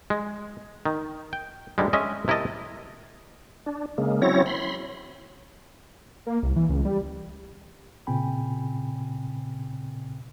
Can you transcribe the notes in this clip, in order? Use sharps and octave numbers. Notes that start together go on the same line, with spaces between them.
G#3
D#3
G5
D2 D3 G3 G#3
G#3 C#4 D#5 E5
C3 E4 A#4 D#5 A5
D4
C#3 G#3 A#3
F#3 C4 C#4 E4 C#5 A#6
B5 C6
A#3
C2
E3
C#2
G3
A#2 C#3 C4 G5 G#5 B5